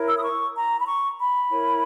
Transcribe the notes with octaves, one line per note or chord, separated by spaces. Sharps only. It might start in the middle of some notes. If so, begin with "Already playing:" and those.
Already playing: E4 A#4 C#5
E6
D#6
C#6
A#5
B5
C#6
B5
E4 A#4 C#5